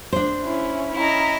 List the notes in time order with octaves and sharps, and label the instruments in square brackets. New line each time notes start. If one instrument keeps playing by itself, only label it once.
[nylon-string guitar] D4 C5
[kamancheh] C#4 E4
[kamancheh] C#4 A#5 [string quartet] E4 D#5